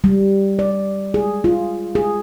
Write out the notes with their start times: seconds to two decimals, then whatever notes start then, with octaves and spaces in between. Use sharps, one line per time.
0.04 G3
0.59 D5
1.14 G#4
1.44 F4
1.95 G#4